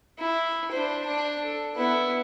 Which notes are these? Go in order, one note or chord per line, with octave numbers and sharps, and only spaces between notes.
E4
D4 C5
D4
A4
B3 E4